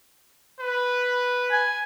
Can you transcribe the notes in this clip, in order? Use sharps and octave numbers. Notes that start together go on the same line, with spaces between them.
B4
G#5